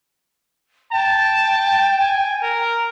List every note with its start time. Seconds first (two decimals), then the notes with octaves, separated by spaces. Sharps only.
0.92 G5 A5
1.99 G#5
2.43 A#4